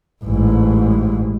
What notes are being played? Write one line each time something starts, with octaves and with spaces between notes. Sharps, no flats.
A1 G#2